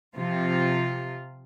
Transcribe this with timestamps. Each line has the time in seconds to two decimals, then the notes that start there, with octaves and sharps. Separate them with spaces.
0.15 C3 F3 F4